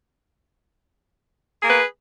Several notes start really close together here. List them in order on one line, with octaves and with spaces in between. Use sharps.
G#4 A#3 B4